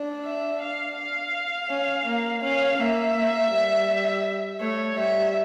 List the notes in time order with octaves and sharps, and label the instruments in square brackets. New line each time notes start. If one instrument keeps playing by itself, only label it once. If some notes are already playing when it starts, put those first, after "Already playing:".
Already playing: [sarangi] D4
[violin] E5
F5
F5
[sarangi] C#4
A#3
[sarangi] C#4 [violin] F5
[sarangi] A#3 [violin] E5
[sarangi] A#3
G3
[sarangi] A3 [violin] C#5
[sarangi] G3 [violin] E5